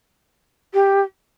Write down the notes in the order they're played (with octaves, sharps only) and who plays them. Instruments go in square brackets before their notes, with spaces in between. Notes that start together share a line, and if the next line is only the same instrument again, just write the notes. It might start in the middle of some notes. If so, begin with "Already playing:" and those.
[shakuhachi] G4